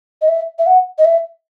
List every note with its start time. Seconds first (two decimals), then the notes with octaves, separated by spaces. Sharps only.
0.22 D#5
0.28 E5
0.59 E5
0.66 F#5
0.98 D#5
1.05 E5